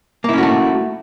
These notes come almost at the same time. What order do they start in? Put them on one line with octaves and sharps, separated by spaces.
A#3 E4 C#4 F#4 A3